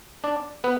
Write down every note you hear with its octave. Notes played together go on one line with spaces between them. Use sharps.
D4 D5
B3 B4